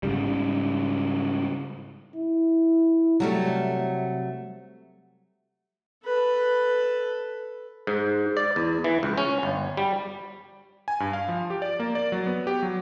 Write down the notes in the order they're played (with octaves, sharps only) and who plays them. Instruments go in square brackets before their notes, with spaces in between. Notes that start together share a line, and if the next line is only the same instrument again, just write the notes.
[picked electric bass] G#2 C#3 G3
[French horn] E4
[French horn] C3 [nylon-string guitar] F#3 G3 A3
[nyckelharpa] A4 B4
[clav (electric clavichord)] G#2
D5
E2
E3
C#2
C#4
G1
G3
[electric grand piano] G#5
G2
F5
F3
G4
D5
A#3
D5
F#3
B3
G4
F#3